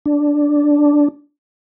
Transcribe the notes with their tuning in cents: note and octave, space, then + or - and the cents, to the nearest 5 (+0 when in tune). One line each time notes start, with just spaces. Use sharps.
D4 -5